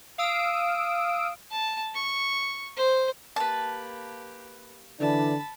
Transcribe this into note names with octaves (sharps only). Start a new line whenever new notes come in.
F5 D#6 E6 D7
A5
C#6
C5
A#3 G4 B4 A5
D3 E3 D4 A5 B5